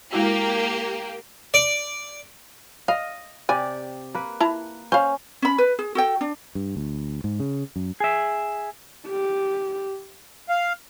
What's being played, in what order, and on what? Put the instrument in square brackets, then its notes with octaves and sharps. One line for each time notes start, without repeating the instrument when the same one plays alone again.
[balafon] G#3 E4 F#4 [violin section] A#3 G4
[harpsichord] D5
[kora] D#5 [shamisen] F5
[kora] C3 G4 D5 [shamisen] G#5
[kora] A#3 B4
[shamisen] E4 A5 A#5
[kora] C#4 [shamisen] C5 F5
[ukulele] C#4 B5
B4
G#4
F#4 A4 G5
D4
[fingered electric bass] G2
D2
G#2
C#3
F#2
[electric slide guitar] G#4 E5
[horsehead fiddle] G4
[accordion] F5